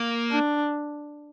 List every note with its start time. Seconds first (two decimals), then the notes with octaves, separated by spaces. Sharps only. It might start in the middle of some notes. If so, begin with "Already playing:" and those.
Already playing: A#3
0.31 D4